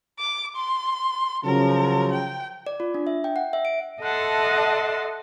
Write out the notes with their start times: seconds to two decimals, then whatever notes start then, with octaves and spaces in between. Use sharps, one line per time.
0.19 D6
0.56 C6
1.45 C#3 F3 F#3 A#4
2.12 G5
2.67 D5
2.80 F4
2.94 D4
3.07 E5
3.24 G5
3.36 F#5
3.53 E5
3.65 D7
4.02 A4 D#5 E5 F#5 A5 C6